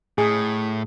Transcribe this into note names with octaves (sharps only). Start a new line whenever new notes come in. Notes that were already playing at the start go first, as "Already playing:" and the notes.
A2 G#4